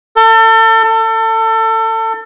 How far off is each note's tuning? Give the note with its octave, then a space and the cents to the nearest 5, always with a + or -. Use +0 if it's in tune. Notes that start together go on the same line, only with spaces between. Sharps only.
A4 +35
A4 +30